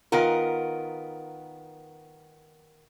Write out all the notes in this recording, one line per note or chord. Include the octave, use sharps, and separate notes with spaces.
D#3 B3 F4 A#4